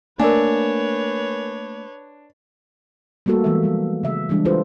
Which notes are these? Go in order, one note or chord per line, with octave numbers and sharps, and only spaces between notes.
A3 A#3 D4 A#4 B4 C#5 G#5
G3 A3 A#3 F#4 A4
E3 G#3 A#3 B3 E5
F3 G3 G#3
C#3 E5
E3 G3 G#3 D4
E4 F4 G4 A4 B4 C5